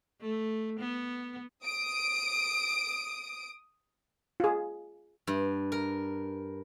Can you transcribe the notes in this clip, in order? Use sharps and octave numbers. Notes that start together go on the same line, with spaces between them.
A3
B3
D#6 D7
F4 G#4
G2
A#4